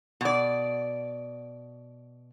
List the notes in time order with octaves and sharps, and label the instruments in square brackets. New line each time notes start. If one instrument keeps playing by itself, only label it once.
[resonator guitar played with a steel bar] B2 D5